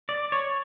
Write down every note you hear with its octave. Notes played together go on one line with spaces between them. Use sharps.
D5
C#5